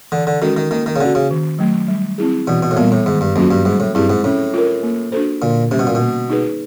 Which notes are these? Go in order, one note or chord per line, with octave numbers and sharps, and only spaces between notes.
D3 E3
D3
D#3 G#3 C#4 F#4 A4
D#3
D#3 A#3
D#3
C#3
D3 C#4 F#4
C#3
D#3
F#3 A3
G3
C4 E4 G#4
B2 E3
B2
A2
A#2 G3 B3
A2
G#2 D#3
G2
F2 F#3 A#3 C#4 F#4
G2
G#2 G3
A2
G2 C4 E4 G#4
G#2
A2 C#4
F4 A#4
A#3
D4 F#4 A4 C5
A#2 D3
C3 G3 A#3 C#4
B2
A#2
B2
A#3
D#4 G#4 B4